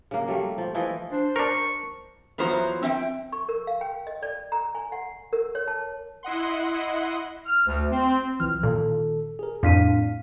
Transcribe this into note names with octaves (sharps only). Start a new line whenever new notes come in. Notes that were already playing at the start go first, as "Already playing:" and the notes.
C#3 A#3
F#3 G3 A3 A#3
F3
E3 F3 E4 D#5
D4 C5
D4 A#4 C#6
E2 F3 F#3 B3 C5 A#5
C4 E5 F#5 G5
C#6
A#4
F5
G5
D#5
D5
A#5
G#5
F#5
A#4
C#5
A5
E4 D#5 F#5 C6
F6
D2
C4
B1 E3 F3 F6
A#2 D#3 A4
G#4 A#4
F2 A2 D4 F5 B6 D#7